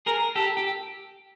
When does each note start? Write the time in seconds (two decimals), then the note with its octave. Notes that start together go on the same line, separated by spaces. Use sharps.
0.06 G#4 A#4
0.36 G4 A4
0.57 G4